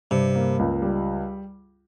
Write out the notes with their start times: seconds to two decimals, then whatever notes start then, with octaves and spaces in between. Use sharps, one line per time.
0.11 G2 C3
0.35 A#3
0.59 C#2
0.82 G3